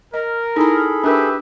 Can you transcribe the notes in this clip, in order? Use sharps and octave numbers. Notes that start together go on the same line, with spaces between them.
A#4 D#5
D#4 E4 G#4 A4 A#5 B5
D4 G4 A#4 B4 E5